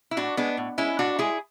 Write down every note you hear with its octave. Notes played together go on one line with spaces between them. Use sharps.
E4
A2 D4 F#4
G#3 B3 D4
A2
G#3 C#4 E4
A2 D4 F#4
G#3 E4 G#4